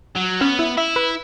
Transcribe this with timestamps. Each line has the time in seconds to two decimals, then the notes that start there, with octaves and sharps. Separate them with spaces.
0.16 F#3
0.41 B3 C#4
0.59 E4
0.77 E4 E5
0.96 B4